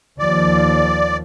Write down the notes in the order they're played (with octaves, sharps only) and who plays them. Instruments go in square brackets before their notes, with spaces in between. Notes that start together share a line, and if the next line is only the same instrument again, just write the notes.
[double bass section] D#2 F3 [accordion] D5